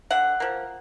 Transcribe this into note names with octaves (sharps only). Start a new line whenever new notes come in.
D3 F#5
F3 A#3